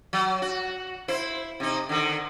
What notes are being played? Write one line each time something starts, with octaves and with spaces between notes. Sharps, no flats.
F#3
F#4
E4 C5
C3 D#4
D3 D#3